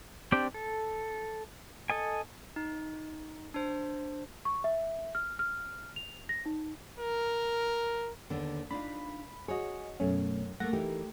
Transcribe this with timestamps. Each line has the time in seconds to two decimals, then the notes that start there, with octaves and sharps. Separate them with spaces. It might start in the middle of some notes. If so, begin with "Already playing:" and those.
0.32 C4 D4 G4 D5 G5
0.54 A4
1.90 A4 D#5 G#5
2.56 D#4
3.54 D4 C5
4.45 C#6
4.64 E5
5.15 F6
5.39 F6
5.96 F7
6.29 A#6
6.46 D#4
6.99 A#4
8.30 D#2 D3 B3
8.71 D4 D#4 F4 B5
9.48 F#4 G#4 C#5 D#5
10.00 F#2 B2 A3 C#4
10.60 A3 A#3 F#5 A#6
10.73 E3 A3 D#4 G4 A#4